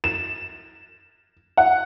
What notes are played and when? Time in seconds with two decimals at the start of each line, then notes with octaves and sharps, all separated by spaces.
0.04 E7
1.57 F#5